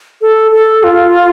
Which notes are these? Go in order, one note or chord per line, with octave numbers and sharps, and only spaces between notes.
A4
A4
F4